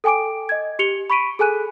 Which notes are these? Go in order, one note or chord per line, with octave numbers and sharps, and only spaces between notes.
A4 G5 G#5 D6 D7
D#5 G#6
G4 C#7 F7 G7
B5 C#6 B6 D7 D#7
G#4 A4 G#5 F#6 D#7